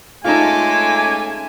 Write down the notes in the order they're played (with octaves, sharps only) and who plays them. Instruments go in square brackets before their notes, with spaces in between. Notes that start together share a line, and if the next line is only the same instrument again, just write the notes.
[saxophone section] G#3 A3 C#4 [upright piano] D#4 F4 [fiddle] A4 D6 [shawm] G#5